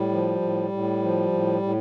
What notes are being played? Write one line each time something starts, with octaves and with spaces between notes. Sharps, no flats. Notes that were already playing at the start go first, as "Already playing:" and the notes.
Already playing: A2 G3
F3
A2
A2
F3
A2
A2